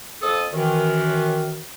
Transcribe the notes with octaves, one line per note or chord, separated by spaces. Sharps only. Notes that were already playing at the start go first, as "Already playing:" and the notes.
F2 A4 D#6
F#2 D#3 E3